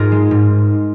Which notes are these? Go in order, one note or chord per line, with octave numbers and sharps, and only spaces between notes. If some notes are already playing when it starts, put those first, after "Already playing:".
Already playing: G#2 D#4 F4 G#4 A#4
G#3
G#2